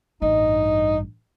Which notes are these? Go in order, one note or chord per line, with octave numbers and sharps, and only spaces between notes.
A1 G2 D#4 D#5